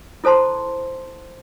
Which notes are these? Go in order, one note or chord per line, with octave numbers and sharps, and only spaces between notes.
E4 A4 C5 A5 C6